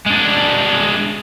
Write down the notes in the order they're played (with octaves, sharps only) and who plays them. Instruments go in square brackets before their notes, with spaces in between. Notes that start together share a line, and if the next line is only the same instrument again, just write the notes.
[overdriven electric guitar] G#3 D4